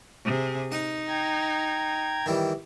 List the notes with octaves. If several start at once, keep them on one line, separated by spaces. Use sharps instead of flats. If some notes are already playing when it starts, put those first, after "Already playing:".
C3 G#4
D#4 F#5
G5 A#5 G#6
D#3 E3 G3